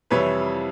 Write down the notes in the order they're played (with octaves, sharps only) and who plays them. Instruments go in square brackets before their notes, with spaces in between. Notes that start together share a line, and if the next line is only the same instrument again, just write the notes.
[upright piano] F2 C3 E3 G3 B4 C#5